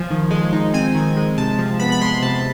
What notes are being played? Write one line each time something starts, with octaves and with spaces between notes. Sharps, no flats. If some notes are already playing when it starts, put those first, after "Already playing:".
Already playing: F3 G#5
D#3
G#3
D#4
C4 G#5
D#3
G#3
C3 A5
F3
B3 B5
B5
G#3 C6
C3 A5